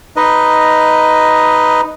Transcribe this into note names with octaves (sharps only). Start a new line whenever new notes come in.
D#4 B4 D#5